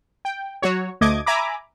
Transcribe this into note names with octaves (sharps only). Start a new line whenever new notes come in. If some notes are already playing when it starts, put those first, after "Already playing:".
G5
F#3 F#4 C#5
D2 A3 D#5 D6 G#6
E5 G#5 A#5 B5 D6